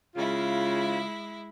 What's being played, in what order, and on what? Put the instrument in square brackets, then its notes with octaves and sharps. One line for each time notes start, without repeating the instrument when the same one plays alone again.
[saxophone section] C#3 F4 [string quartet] G#3 E4